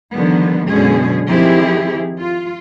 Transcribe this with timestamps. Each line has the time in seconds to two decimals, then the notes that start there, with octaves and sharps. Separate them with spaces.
0.13 D3 D#3 F3 G3 B3
0.67 F#2 B2 D3 G#3 C#4 G#4
1.26 D#3 F3 C4 E4 G4 G#4
2.20 F4